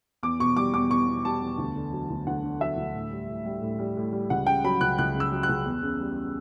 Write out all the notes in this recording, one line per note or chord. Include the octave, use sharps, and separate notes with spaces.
E2 D6
B2 C#6
G3 D6
E2 D6
E2 C#6
B2
G3 A5
E2
D2
D3
F#3
D2
D2 F#5
D3
F#3 E5
D2
A2
G3
A2
G3
A2
G3
A2
G3
C#2 F#5
C#3 G5
F#3 B5
C#2 F#6
C#2 F#6
C#3 E6
F#3
F#6
C#2
E2
C#3
G3